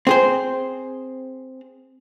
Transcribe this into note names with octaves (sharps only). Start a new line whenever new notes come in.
C4 G#4 C5